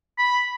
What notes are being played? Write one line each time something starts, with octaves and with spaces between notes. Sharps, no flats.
B5